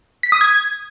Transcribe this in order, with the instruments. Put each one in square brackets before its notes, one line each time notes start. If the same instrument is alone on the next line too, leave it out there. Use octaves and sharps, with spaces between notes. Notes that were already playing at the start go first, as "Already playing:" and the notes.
[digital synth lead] B6
D#6
G#6